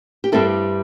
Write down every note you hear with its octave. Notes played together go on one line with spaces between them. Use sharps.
G4
G2 G3 C4 E4 A4